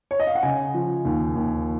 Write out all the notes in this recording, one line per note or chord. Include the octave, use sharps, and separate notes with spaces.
C#5
D#5
F5
F#5
C#3 G#5
F3
D#2
D#2